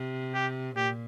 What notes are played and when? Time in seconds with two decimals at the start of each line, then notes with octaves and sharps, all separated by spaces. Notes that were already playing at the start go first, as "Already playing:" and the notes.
Already playing: C3
0.34 G4
0.76 A#2 G4